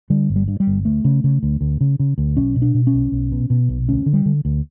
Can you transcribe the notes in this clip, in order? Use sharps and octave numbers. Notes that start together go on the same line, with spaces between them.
D3 G3
G1
G3
G2
G3
G1
D2 A3
C#3
C#3
D2
D2
C#3
C#3
D2
B1 C#4
B2
D4
B2
C#4
B1
B1
B2
B2
B1
D2 C#4
D3
G3
D3
D2